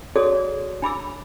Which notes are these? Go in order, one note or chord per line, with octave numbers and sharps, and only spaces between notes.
F#4 G#4 A4 C#5 D5 D#6
D4 B5 D6 E6